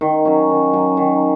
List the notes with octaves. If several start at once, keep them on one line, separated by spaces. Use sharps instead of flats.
D#3
F#3 C#4
D#3
F#3 C#4
D#3